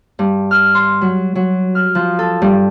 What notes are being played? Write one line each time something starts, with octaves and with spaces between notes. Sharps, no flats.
G2
F6
C6
F#3
F#3
F6
F3
A4
G2